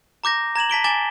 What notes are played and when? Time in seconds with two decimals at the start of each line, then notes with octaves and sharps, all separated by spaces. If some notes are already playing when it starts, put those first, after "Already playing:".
0.24 A#5 D6 G6 A#6
0.55 A#5 G#6 E7 F#7
0.70 A5 B6 D7 G7
0.84 G#5 D6 A6 E7 G7